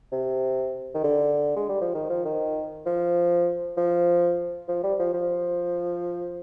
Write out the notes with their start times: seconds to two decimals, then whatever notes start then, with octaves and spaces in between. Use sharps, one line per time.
0.12 C3
0.95 D#3
1.04 D3
1.56 G#3
1.69 G3
1.82 F3
1.95 D#3
2.10 F3
2.25 D#3
2.86 F3
3.77 F3
4.68 F3
4.83 G3
4.99 F3
5.14 F3